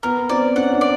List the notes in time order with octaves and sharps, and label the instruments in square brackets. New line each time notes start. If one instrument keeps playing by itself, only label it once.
[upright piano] B3 [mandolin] A#4
[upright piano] C4 [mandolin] D5
[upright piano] C#4 [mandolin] F#5
[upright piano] D4
[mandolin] D5